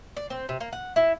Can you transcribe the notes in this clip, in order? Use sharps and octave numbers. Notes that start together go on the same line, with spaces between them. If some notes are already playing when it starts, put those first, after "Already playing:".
D5
C4
C3
A#3
F#5
E4